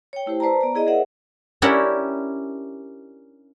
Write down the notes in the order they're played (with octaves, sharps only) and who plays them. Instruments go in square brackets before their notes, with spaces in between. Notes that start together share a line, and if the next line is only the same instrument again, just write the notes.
[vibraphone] C#5 G5
A3 E4 G4 C5
B4 C5 D5 A5 A#5
B3 D5 A#5
E4 G#4 D5 D#5
G#4 A#4 C5 D5 E5 F#5
[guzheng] C#4 D4 E4 G4 A#4 F#5